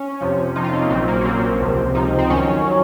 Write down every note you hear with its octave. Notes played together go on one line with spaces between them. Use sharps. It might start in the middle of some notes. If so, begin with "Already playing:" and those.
Already playing: C#4
F2 C3 F3
F2 C3 F3 D#4
F4
C4
A#3
A#1 A#2 F#3 C4
A#3
C#4
A#1 A#2 F#3 C4
C#2 C3 F3
C#2 C3 F3 D#4
C4
F2 D#3 F#3 C#4
D#3 F#3